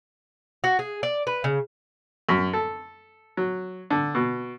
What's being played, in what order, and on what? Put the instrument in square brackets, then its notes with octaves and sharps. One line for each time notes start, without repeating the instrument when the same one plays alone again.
[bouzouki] F#4
G#4
D5
B4
C#3
[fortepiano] F#2
A4
F#3
D3
B2